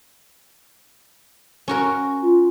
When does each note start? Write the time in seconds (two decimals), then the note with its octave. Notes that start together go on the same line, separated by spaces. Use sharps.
1.68 C#4 F#4 A#4
2.22 F4